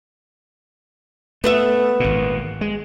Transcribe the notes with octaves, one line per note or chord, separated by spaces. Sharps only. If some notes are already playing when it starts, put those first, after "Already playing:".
A3 B3 B4 E5
G#1 A#2
G#3